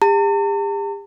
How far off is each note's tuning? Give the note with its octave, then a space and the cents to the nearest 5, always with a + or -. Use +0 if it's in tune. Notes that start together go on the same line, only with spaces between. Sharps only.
G4 +45 A5 +45